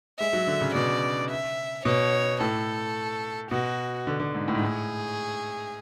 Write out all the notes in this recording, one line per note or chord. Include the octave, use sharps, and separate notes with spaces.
G#3 E5
F#3
D3
C#3
B2 D5
E5
B2 C#5
A2 A4
B2 F#4
D3
D3
G#2
A2
G#2
A2 G#4